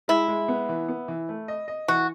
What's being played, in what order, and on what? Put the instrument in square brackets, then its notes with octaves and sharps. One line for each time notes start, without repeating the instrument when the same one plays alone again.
[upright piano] G#3 [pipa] E4
[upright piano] G#3
B3
E3
B3
E3
A3
D#5
D#5
[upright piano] E3 [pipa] F#4